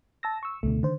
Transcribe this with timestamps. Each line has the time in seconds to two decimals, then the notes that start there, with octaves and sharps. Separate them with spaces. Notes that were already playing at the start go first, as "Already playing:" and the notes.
0.23 A5 E6 A#6
0.43 C#6 E6
0.63 C#2 B2 D3 A3
0.83 D3 D#3 C5